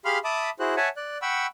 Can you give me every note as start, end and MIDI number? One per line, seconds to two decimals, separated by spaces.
0.05 0.19 67
0.05 0.19 68
0.05 0.19 77
0.05 0.19 83
0.05 0.19 84
0.05 0.19 89
0.24 0.50 76
0.24 0.50 81
0.24 0.50 83
0.24 0.50 86
0.24 0.50 87
0.60 0.75 64
0.60 0.75 66
0.60 0.75 68
0.60 0.75 72
0.60 0.75 90
0.77 0.89 73
0.77 0.89 76
0.77 0.89 78
0.77 0.89 80
0.77 0.89 81
0.97 1.18 74
0.97 1.18 90
1.22 1.46 78
1.22 1.46 79
1.22 1.46 83
1.22 1.46 85
1.22 1.46 88